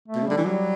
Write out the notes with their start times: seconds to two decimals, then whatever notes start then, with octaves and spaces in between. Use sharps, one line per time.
0.08 A3
0.16 B2
0.23 C#3
0.27 D3 G3
0.38 E3
0.45 F#3 G3